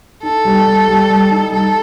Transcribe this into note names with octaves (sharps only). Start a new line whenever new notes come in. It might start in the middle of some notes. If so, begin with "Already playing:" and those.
D#4 A4
G3
G3
G3
G3
D#4
G3 A4